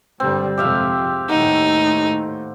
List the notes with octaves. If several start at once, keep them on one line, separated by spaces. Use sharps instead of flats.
G2 D3 G3 C4
F2 G#2 C3 G4 E5 F5
D#2 A2 D#4 F#5